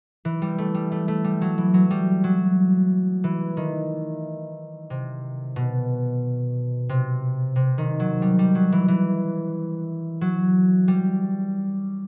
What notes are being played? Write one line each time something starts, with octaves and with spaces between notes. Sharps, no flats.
E3
G3
A3
G3
A3
A3
G3
F#3
E3
F#3
G3
F#3
E3
D#3
C3
B2
C3
C3
D#3
F#3
G3
G3
F#3
E3
E3
F#3
G3